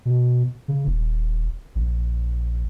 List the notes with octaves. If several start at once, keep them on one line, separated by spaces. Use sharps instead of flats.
B2
C#3
D#1
A#1